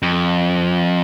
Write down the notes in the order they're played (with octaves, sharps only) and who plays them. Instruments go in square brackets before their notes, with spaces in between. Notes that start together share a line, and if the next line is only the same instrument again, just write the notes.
[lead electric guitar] F2